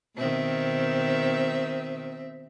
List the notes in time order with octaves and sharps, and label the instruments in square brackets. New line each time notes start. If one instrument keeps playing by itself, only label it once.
[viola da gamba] B2 D#3 [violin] C4 E5